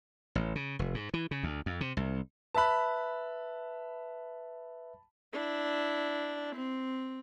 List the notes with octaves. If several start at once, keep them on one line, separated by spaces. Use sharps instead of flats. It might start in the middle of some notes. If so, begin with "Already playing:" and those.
A1
C#3
F1
G#2
E3
C#3
D2
F2
C3
C2
B4 E5 A5 B5 F#6
D4 E4
C4